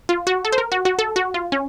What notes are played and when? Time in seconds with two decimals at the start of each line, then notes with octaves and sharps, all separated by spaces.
0.09 F4
0.27 F#4
0.45 A4
0.52 C5
0.58 A#4
0.72 F#4
0.85 F#4
0.99 A4
1.16 F#4
1.34 F4
1.52 C#4